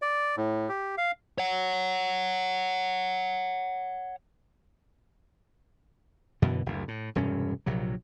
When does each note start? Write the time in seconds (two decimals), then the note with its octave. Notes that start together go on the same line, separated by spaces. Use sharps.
0.02 D5
0.37 A2
0.69 G4
0.98 F5
1.38 C#5 F#5
6.42 F#2 B2 D3 E3
6.66 F#1 D2
6.88 A2
7.15 E1 G2 C3 C#4
7.66 A#1 C3 F#3